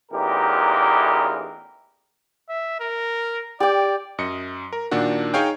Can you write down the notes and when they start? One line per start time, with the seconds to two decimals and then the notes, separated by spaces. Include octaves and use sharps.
0.12 A1 E2 A#2 D#4 G4 A#4
2.49 E5
2.80 A#4
3.60 G4 D5 G5
4.18 F#2 D#5 C#7
4.73 A#4
4.91 A#2 D#3 D4 F#4
5.34 D#4 G#4 C#5 F5 G5